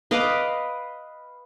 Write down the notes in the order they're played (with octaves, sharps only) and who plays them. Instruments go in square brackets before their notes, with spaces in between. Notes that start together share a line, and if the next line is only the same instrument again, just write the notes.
[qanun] B4 D#5 F5 D6